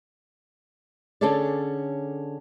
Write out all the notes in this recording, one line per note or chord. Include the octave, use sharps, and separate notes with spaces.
D3 C#4 G#4 A4 C#5 D5